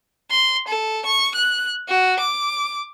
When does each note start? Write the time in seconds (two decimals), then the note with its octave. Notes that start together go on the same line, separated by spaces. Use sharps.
0.31 C6
0.68 A4
1.06 C#6
1.35 F#6
1.88 F#4
2.20 D6